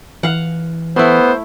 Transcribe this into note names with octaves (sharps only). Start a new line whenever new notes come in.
E3 F5 F#5
A3 B3 E4 C5